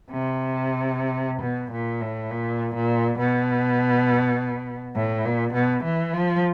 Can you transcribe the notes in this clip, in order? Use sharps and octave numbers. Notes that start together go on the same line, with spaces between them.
C3
B2
A#2
A2
A#2
A#2
B2
A2
A#2
B2
E3
F3